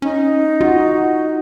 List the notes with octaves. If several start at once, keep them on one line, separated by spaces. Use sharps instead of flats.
C#4 D#4
F4 F#4